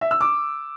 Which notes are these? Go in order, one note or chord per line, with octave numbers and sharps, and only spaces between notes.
E5
E6
D6